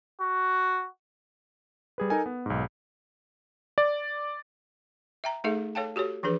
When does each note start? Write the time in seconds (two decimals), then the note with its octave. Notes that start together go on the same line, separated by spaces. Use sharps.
0.21 F#4
1.98 G3 G#4 B4
2.10 D#4 A4 A#4 G#5
2.26 B3
2.46 B1 G#2
3.78 D5
5.24 E5 G5 A#5
5.44 A3 D#4 G#4 A4 E5
5.75 A4 C#5 F5 G5 A5
5.96 F#4 G4 A4 C#5
6.23 E3 F3 D4 G#4 B4